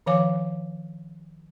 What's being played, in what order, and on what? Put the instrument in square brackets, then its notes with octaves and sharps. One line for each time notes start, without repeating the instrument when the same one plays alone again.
[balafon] D#3 F3 C#5 F5 G#5 D6